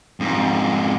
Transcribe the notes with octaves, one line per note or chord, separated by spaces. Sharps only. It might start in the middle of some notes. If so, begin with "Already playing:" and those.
F2 G#2